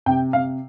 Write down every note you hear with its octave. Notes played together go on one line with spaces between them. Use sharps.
C3 G5
C3 F5